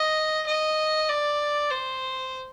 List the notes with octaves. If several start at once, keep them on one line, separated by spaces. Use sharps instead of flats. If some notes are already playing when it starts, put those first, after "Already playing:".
Already playing: D#5
D#5
D5
C5